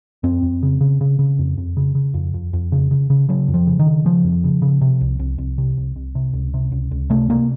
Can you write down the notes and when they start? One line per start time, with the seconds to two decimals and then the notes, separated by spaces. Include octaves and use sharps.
0.23 F2 C4
0.43 F2
0.63 C#3
0.81 C#3
1.01 C#3
1.19 C#3
1.39 F2
1.58 F2
1.77 C#3
1.95 C#3
2.14 F2
2.34 F2
2.53 F2
2.72 C#3
2.91 C#3
3.10 C#3
3.29 C#3 F#3
3.48 F2
3.54 F3
3.67 C#3
3.79 D#3
3.86 C#3
4.05 C#3 F3
4.24 F2
4.44 C#3
4.62 C#3
4.81 C3
5.01 C2
5.19 C2
5.38 C2
5.58 C3
5.78 C2
5.96 C2
6.15 C3
6.34 C#2
6.54 C3
6.72 C#2
6.91 C#2
7.10 C3 A3
7.29 C3 A#3